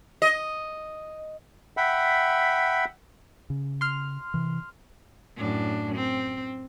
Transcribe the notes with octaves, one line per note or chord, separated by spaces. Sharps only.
D#5
E5 F#5 G5 B5
C#3
C6 F6
C3 E3
F#2 A2 D4
C4